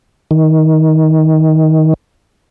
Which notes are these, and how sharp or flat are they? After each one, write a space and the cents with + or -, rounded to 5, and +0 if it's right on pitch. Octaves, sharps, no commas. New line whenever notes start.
D#3 +20